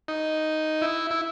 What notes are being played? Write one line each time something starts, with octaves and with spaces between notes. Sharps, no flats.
D#4
E4
E4